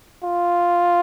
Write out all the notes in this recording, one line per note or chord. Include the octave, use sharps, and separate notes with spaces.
F4